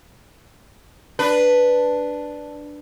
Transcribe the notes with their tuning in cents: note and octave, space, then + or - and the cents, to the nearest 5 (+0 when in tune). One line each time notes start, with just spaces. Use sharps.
D4 +0 B4 +0